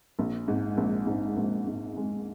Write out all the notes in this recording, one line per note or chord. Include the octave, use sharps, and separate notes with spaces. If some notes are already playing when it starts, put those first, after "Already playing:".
A#1
G#2
A#1
G#2
A#1
G#2
G#3